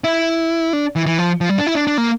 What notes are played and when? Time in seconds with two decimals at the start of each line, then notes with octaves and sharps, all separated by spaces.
0.04 E4
0.73 D4
0.96 E3
1.06 E3
1.19 F3
1.41 F3
1.49 G3
1.58 D4
1.67 E4
1.75 D4
1.87 D4
1.98 A#3